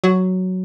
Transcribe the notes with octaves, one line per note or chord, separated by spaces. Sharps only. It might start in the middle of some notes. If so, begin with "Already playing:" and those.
F#3